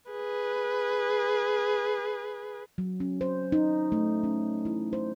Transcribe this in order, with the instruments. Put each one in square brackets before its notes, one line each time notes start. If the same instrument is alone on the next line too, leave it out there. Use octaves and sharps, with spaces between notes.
[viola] G#4 B4
[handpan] F#3
C#4
C5
D#4
A3
C#4
E4
C5